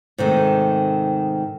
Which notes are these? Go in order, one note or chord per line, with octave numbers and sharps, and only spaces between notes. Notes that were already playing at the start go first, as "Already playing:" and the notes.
G#2 C3 D#3 A3